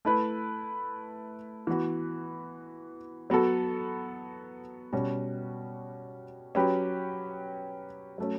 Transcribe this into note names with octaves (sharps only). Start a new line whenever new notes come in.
A3 E4 B4
E3 B3 F#4 B4
F#3 B3 F#4 A4
B2 G3 C#4 F#4
F#3 C#4 G4 B4
F#3 A3 C#4